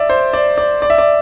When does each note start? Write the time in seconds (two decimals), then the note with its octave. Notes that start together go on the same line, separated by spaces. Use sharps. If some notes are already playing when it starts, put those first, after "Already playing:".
Already playing: D5 E5
0.10 C5
0.33 D5
0.58 D5
0.82 D5
0.90 E5
0.98 D5